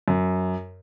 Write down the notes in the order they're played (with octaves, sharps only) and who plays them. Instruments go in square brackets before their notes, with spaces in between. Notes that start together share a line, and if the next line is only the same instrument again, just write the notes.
[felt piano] F#2